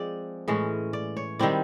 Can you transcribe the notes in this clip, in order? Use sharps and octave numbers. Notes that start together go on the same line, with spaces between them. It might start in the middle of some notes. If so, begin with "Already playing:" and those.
Already playing: F3 G#3 C4 D5
A2 E3 G#3 C#4
D5
C#5
D#3 G3 C4 E4 D5